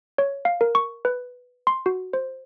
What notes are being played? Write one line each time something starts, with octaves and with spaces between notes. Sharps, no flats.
C#5
F5
A#4
C#6
B4
C6
F#4
C5